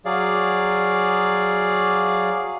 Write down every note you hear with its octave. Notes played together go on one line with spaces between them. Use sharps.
F#3 G#4 D5 F5